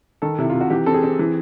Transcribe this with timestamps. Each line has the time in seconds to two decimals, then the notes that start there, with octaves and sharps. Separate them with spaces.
0.22 D#3 A4
0.38 C3 E4
0.50 C3 F4
0.61 F#4
0.70 E3 G4
0.86 C4 A4
0.94 G#4
1.03 C4
1.19 E3